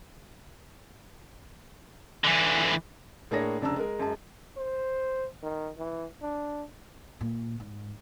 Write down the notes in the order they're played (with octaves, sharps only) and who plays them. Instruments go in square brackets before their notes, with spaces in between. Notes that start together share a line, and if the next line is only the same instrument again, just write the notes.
[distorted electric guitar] D3 E3
[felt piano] A2 A#3 D4 G#4 C#5 A#6
F1 C#3 D4 A5 A#5 E6
G#3 A#4
F#2 G#3 A5
[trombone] C5
D#3
E3
D4
[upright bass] A#2
G#2